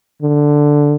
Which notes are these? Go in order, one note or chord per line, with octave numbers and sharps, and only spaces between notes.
D3